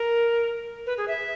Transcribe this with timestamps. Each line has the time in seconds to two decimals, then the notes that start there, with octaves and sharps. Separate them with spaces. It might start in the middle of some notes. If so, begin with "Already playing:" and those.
Already playing: A#4
0.86 B4
0.98 G#4
1.08 E5